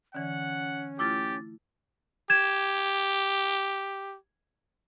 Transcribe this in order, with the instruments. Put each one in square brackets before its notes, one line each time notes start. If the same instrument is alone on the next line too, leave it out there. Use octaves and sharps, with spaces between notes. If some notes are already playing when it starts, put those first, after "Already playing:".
[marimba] D3 E3 [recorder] C#4 [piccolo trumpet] F#5
[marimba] A3 E4 F4 [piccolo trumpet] G4 [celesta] D6 A6
[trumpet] G4 [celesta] G#6 E7